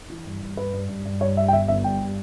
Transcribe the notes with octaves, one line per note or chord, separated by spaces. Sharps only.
E3
G2
G2
G2 B4
G2
G2
G2
G2 C#5
G3 E5
G5
G1 E5
G1 E5
G2 G5
G3